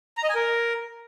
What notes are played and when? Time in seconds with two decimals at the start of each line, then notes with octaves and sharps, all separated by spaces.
0.17 A#5
0.23 D#5
0.29 G#5
0.35 A#4